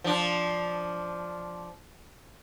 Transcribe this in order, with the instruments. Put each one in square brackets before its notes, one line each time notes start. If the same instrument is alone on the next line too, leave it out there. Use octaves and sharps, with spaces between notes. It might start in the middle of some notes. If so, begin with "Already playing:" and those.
[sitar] F3 D4